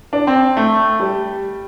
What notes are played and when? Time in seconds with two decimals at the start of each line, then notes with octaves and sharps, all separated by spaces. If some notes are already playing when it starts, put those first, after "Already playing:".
0.13 D4
0.27 C4
0.57 A3
1.00 G3